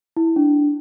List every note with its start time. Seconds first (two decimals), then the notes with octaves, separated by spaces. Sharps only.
0.16 E4
0.36 D4